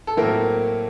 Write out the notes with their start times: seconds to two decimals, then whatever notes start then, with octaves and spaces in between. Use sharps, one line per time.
0.07 A4
0.17 A2 F#3 A3 A#3 C4 A#4